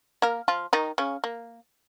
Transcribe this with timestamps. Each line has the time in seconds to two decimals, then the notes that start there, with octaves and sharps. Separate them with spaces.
0.22 A#3 A#4
0.48 F3 F4
0.73 D#3 D#4
0.98 C#3 C#4
1.24 A#3